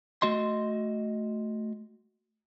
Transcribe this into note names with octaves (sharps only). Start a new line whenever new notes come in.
A3 F#4 D#5 C6